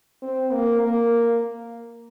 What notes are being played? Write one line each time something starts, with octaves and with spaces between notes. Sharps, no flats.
C4
A#3
A#3